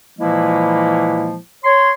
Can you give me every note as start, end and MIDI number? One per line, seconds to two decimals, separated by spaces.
0.19 1.37 46
0.19 1.37 52
0.19 1.37 53
0.19 1.37 56
0.19 1.37 58
0.19 1.37 64
1.65 1.91 73
1.65 1.91 84